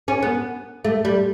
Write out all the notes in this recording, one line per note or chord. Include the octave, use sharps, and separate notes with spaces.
C#4
B3
A3
G3